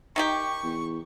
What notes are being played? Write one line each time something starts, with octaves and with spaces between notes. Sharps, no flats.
D#3 D#4 G4 C#6
E2